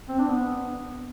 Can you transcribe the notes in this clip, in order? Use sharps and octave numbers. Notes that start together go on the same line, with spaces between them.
C4
D4
B3